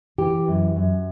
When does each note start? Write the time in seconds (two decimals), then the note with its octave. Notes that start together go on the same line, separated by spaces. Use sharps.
0.18 E3 G4
0.48 F#2
0.76 F#2